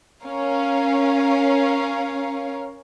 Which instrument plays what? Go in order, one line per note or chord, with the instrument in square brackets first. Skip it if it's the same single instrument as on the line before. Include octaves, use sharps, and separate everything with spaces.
[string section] C#4 A#4 C#5 F5